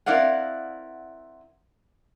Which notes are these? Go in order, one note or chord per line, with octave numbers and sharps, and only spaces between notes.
C4 E4 A#4 D5 F5 F#5